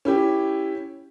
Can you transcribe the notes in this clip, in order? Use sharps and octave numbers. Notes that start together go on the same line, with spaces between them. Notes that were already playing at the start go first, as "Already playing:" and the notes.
C#4 E4 G4